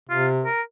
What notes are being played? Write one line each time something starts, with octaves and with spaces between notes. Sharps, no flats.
C3 F4
A#4